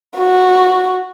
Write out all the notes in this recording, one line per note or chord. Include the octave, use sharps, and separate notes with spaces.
F#4